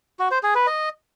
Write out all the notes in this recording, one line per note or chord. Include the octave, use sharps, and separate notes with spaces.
F#4
C5
G#4
B4
D#5